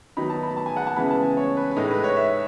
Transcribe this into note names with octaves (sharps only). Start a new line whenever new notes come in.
D#3 F#3 B3 D#4 B5
A5
B5
A5
G#5
F#5
A5
C#3 E3 G#3 B3 E4 B5
A5
G#5
C#5
B4
B4
A2 G#3 D#4 A4
B4
C#5
E5